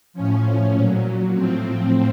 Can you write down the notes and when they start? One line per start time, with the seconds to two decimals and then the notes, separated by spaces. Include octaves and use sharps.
0.13 A2 F3 C#4
0.74 A#2 F#3
1.34 A2 F3 C4